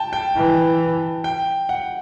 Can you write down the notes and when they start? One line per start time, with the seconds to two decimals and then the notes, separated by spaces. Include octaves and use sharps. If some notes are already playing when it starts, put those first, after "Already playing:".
Already playing: G5 A5
0.13 G5
0.35 E3
1.24 G5
1.69 F#5